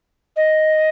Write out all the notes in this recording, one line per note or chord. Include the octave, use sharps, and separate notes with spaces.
D#5